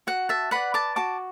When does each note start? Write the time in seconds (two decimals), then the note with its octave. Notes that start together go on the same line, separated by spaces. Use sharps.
0.07 F#4 F#5
0.29 E5 A5
0.51 B4 D5 F#5 B5
0.74 A5 D6
0.96 F#4 A5 D6